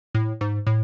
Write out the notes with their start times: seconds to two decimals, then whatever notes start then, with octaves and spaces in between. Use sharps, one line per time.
0.14 A2
0.41 G#2
0.67 A2